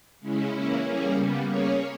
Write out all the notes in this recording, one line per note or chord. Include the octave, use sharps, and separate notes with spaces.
C#3 G#3 C#4 E4
E3 A#3 C#4 E4
G3 A#3 C#4 G#4
C#3 G3 B3
A#3 C#4 G#4 C#5